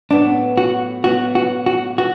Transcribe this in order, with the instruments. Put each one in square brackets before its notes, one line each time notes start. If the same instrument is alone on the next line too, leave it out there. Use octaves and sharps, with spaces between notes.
[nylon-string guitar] A2 F#3 B3 [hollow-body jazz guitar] D4
[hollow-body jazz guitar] F#4
[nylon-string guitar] A2 F#3 B3 [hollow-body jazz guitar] F#4
[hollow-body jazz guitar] F#4
F#4
[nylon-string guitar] B3 [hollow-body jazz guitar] F#4